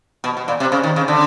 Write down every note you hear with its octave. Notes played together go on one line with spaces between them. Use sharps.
B2
B2
A#2
C3
C#3
D#3
C#3
D3